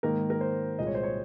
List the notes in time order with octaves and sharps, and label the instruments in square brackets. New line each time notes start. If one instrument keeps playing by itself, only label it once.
[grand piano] G#2 D#3 A#3 A#4
A#4
C5
C2 A#2 G#3 D#5
C#5
C5
C#5